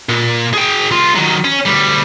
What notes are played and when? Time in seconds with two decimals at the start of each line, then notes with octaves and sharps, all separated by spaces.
0.09 A#2
0.54 G#4 G5
0.91 C2 F4
1.15 D#3 F#3
1.45 C#4
1.66 D2 G3